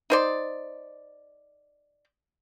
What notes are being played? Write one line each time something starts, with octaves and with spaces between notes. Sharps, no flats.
D#4 C5 D5